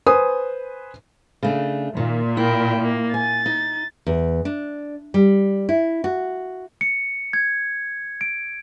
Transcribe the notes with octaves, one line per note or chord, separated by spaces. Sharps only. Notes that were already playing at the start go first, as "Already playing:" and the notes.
B4 C5 G#5 D#6
C#3 A3 D4
A#2 D#3
E4 A#4 G5
A#3
G#5 A6
D#4
E2
D4
G3
E4
F#4
C#7
G#6
D7